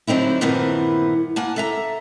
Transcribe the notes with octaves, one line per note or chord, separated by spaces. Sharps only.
D3 F#3 C4 D#4 E4
G2 A#2 D#3 E3 B3 C4
A#3 F#5 G#5 A5
A4 E5 A#5